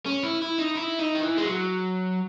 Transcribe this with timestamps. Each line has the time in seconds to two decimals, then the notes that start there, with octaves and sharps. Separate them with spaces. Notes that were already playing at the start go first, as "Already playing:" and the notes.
0.06 C#4
0.23 E4
0.42 E4
0.58 D#4
0.76 E4
0.99 D#4
1.15 D#3
1.23 E3
1.38 G#3
1.46 F#3